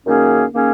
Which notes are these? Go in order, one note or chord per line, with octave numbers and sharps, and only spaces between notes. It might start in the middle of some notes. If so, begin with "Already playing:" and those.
F#2 D#3 A#3 C#4 G#4
D#3 A#3 C#4 G#4